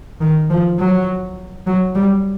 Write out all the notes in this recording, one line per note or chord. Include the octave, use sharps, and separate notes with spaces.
D#3
F3
F#3
F#3
G3